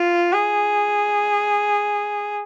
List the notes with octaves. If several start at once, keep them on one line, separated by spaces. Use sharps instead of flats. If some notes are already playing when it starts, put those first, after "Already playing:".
Already playing: F4
G#4